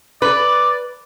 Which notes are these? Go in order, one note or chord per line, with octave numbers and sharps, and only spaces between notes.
B4 D5